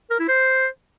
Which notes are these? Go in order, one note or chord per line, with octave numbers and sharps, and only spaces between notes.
A#4
E4
C5